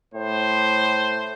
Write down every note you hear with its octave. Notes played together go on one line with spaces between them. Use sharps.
A2 C5